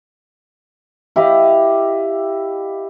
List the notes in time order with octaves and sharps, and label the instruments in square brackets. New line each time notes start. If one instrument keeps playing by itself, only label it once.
[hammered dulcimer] E4 G4 D#5 F5